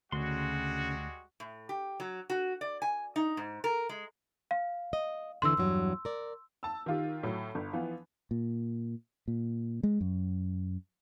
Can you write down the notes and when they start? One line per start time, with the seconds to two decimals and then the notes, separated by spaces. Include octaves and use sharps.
0.12 D2 C#3 G3 G#3 F#4 C6
1.40 A2
1.69 G4
2.00 F#3
2.30 F#4
2.61 D5
2.82 G#5
3.16 D#4
3.37 G#2
3.64 A#4
3.89 G#3
4.51 F5
4.93 D#5
5.42 D#2 D3 E3 C6 E6
5.57 E2 G2 F#3
6.05 A#4 D5
6.63 A5 E6
6.86 D#3 F4 G4
7.23 A2 F#3
7.55 G1
7.73 E3 F3 B3
8.31 A#2
9.28 A#2
9.83 G#3
10.01 F#2